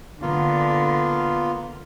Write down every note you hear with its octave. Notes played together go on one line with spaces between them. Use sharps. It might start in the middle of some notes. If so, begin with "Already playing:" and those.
D3 A#3 B3 F4